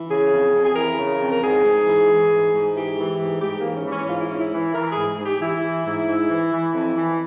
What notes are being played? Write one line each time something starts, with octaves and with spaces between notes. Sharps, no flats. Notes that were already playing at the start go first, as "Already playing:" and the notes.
Already playing: E3
C#3 G#4
F2
F2
G#4
E3 A#4
C#3
F2
A#4
G#2 G#4
G#2
E3
E3
G#2
G#2
E3 G4
E3
G#2
G#2 G4
A#3
E3
C#4
E3 C#4
G#2 F4
E4
G#2 C#4
E4
E3
E3 A#4
G#2 G#4
G#2 G#4
G4
E3 E4
E3
G#2
G#2
E3
E3
F2
E3